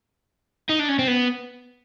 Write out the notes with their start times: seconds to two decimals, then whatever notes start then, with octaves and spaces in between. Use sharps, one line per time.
0.69 D#4
0.79 D4
0.89 C#4
0.99 C4
1.07 B3